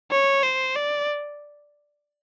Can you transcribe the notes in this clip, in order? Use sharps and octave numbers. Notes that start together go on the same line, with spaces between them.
C#5
C5
D5